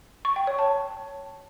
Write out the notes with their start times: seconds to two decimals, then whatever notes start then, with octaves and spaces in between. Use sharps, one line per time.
0.25 C#6
0.36 G5
0.47 C#5
0.59 A5